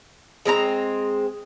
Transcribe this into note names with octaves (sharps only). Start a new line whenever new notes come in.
G#3 C4 E4 A#5